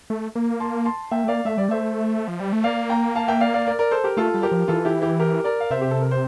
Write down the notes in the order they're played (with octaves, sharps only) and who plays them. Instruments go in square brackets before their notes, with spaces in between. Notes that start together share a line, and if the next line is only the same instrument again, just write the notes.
[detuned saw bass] A3
A#3
[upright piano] A5 C6
A5 C6
[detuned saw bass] A#3 [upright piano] E5 G5
[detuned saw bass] A3
[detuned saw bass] A#3 [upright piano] D5 F5
[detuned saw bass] A3 [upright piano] E5
[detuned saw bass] G3 [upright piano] D5
[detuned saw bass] A3 [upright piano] C5 E5
[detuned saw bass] F3
G3
A3
[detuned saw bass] A#3 [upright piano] D5 F5
[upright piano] G5 A#5
F5 A5
E5 G5
D5 F5
D5 F5
A#4 D5
A#4 D5
A4 C5
G4 A#4
[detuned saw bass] A3 [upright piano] F4 A4
[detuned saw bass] G3
[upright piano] G4 A#4
[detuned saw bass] F3
[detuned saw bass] E3 [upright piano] F4 A4
[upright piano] E4 G4
E4 G4
G4 A#4
A#4 D5
F5
[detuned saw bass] C3 [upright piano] C5 E5
[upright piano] G4
A4
A#4
C5